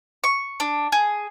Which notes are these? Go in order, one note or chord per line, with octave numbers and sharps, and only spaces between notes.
C#6
D4
G#4